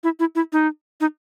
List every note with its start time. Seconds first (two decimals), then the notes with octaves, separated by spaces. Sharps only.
0.04 E4
0.20 E4
0.35 E4
0.53 D#4
1.01 D#4